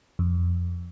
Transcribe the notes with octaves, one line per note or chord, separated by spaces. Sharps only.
F2